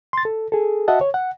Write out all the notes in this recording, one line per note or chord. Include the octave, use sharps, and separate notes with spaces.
C6 A6
A4
G#4 A4
F#4 D#5 E5 F#5 A5
C#5
F#5